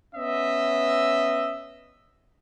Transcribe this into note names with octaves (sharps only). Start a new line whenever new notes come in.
B3 C#4 D#5 E5